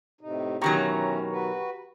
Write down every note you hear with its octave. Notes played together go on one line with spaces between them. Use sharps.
A2 C3 D#4
B2 D#3 E3 F#3 C#4 G4 A#5 C#6
F#4 B4